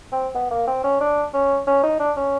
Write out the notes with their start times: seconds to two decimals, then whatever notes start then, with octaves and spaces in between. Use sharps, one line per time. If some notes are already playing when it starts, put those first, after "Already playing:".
0.12 C4
0.35 B3
0.51 A#3
0.67 C4
0.84 C#4
1.00 D4
1.34 C#4
1.67 C#4
1.83 D#4
2.00 D4
2.16 C#4